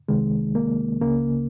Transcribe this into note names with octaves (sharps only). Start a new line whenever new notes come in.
C2 C3 D#3 G#3
A#3
C#2 C#3 A#3